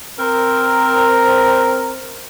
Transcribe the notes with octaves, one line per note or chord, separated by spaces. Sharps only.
C4 A#4